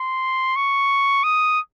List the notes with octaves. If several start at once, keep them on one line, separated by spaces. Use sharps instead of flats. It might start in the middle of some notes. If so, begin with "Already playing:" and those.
Already playing: C6
C#6
D#6